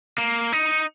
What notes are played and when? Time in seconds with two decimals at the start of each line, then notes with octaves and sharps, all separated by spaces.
0.18 A#3
0.53 D#4